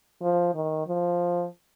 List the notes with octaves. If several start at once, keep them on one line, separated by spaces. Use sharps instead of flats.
F3
D#3
F3